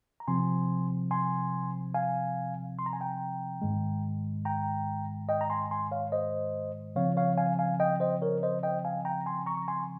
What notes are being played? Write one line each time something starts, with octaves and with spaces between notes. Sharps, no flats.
A#5
C3 F3 C4 G#5 C6
G#5 C6
F5 G#5
C6
A#5
G#5
G5 A#5
G#2 D#3 G#3
G5 A#5
D#5 G5
A#5
G#5 C6
G#5 C6
C#5 F5
C5 D#5
C#3 F3 C4 C#5 F5
C#5 F5
F5 G#5
F5 G#5
D#5 G5
C5 D#5
A#4 C#5
C5 D#5
D#5 G5
F5 G#5
G5 A#5
G#5 C6
A#5 C#6
C#6
G#5 C6